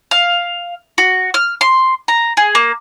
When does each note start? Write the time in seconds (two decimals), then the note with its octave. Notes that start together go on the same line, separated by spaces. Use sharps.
0.11 F5
0.98 F#4
1.34 F6
1.61 C6
2.08 A#5
2.37 G#4
2.55 A#3